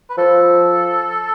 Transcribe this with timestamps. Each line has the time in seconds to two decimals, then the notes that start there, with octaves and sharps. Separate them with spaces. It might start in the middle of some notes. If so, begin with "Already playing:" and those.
0.10 B4
0.18 F3 A4